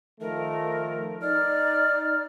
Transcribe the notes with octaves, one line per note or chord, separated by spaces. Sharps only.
D#3 F3 A3 A#4
D#4 D5 F6